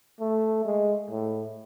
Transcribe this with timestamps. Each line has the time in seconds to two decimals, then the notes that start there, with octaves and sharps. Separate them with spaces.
0.20 A3
0.65 G#3
1.10 A2